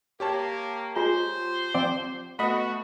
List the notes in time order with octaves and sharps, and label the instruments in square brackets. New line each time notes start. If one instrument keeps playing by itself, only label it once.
[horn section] A#3 [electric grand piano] G4 C#5 A5
[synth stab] G#3 [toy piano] F4 [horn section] C5
[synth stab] F3 C4 D5
[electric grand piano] A3 B3 [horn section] F#4 [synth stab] D#5 B5